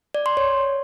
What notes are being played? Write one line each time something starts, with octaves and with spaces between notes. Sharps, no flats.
D5
C6
C#5